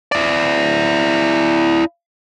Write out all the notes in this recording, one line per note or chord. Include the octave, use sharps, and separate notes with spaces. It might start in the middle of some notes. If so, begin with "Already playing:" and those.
E4 D5